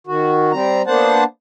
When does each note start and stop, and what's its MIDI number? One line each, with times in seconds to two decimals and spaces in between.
0.07 0.52 51
0.07 0.52 66
0.52 0.82 55
0.52 0.82 60
0.52 0.82 82
0.87 1.24 58
0.87 1.24 59
0.87 1.24 62
0.87 1.24 72
0.87 1.24 78
0.87 1.24 81